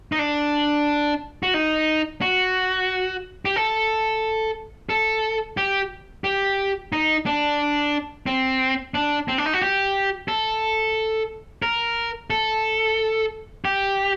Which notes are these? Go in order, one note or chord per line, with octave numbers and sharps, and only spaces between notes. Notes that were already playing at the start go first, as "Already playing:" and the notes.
D#4
D4
F#4
D#4
F#4
G4
A4
A4
G4
G4
D#4
D4
C4
D4
C4
D4
D#4
F#4
G4
A4
A#4
A4
G4